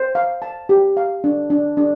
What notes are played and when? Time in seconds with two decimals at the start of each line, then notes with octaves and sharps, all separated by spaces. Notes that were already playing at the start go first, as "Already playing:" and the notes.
Already playing: C5
0.15 F5
0.42 A5
0.69 G4
0.97 F5
1.24 D4
1.50 D4
1.77 D4